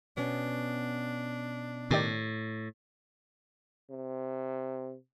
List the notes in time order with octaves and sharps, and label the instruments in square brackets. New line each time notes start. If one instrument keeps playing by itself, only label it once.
[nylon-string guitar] B2 B3 C#4 [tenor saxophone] D4
[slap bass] A2 [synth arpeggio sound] D#3 G4 D5
[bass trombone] C3